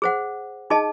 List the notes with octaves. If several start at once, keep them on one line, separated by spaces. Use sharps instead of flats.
G#4 C5 F#5
D#4 G#4 D#5 A5